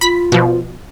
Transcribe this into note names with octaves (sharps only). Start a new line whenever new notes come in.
F4 B5 B6
B2 F3